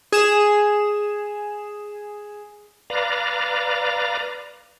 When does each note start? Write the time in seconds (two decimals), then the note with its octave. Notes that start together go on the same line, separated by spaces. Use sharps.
0.12 G#4 E7
2.90 B4 D5 F5 A#5